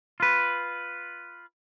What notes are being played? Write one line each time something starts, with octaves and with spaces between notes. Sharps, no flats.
F4 B4